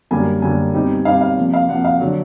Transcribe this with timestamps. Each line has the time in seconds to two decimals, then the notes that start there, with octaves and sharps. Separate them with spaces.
0.11 F#2 D3 G3 A#3 G#5
0.42 F#2 D3 G3 A#3 G#5
0.74 B2 G3 C4 D#4
1.05 B2 G3 C4 D#4 F5
1.21 F5
1.37 C3 F3 A#3
1.53 F5
1.69 C3 F3 A#3 F#5
1.85 F5
2.00 D3 F#3